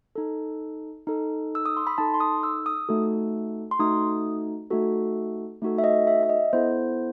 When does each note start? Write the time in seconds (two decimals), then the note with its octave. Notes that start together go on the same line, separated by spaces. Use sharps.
0.16 D#4 A4
1.07 D#4 A4
1.55 E6
1.66 D#6
1.77 C6
1.87 B5
1.98 D#4 A4 A5
2.14 C6
2.20 D#6
2.43 E6
2.66 D#6
2.89 A3 D#4 F#4 A4
3.71 C6
3.80 A3 D#4 F#4 A4 D#6
4.70 A3 D#4 F#4 A4
5.62 A3 D#4 F#4 A4
5.78 E5
5.84 D#5
6.07 E5
6.23 E5
6.29 D#5
6.53 B3 E4 A4 C5